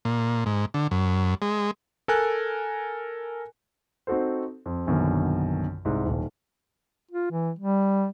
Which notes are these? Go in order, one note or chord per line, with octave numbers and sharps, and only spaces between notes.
A#2
G#2
D3
F#2
G#3
A4 A#4 G#5 F#6
C4 D#4 F#4 A4 C5
F2
A#1 F#2 B2 D3 D#3
C2 G#2
D#1 B1
F4
E3
G3